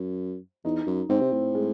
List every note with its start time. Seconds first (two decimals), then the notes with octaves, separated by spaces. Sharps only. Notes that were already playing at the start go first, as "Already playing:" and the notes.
Already playing: F#2
0.64 E2 D#4
0.86 F#2
1.09 G#2 C4
1.21 C3
1.32 A2
1.55 G#3